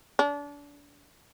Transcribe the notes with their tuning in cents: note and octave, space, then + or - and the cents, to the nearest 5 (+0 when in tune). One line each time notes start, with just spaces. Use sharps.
D4 -30